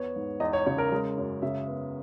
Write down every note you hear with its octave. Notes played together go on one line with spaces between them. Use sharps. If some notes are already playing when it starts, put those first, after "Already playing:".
Already playing: E2 B3 C#5
G#2
E2 D#5
C#5
C#3 C#5
A#4
G#3
F#2
C#3 E5
B3